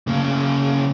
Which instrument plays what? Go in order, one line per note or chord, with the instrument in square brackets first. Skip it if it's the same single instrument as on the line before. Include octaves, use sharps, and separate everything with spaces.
[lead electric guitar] C#3 A#3